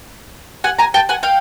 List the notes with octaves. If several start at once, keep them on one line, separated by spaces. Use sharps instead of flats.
F#5 G#5
G#5 A#5
G5 A5
F#5 G#5
F5 G5